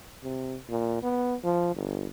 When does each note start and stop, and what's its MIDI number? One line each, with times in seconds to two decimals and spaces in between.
0.24 0.56 48
0.70 1.00 46
1.03 1.35 59
1.44 1.72 53
1.75 2.07 31